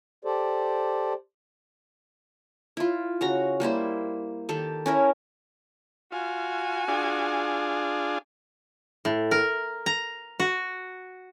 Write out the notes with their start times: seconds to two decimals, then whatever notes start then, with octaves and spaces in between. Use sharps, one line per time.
0.25 G4 A4 C5 D5
2.77 E4 F4
3.21 C#3 F#4 A#5
3.60 G3 A#3 E4 C5
4.49 D#3 G4 A4
4.86 C#4 E4 A#4
6.12 F4 F#4 G#5
6.88 D4 F4 G#4
9.05 A2
9.31 A#4
9.86 A#5
10.40 F#4